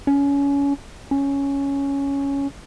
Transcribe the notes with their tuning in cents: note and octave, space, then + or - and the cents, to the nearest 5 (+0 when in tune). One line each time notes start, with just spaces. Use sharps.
C#4 +25
C#4 +5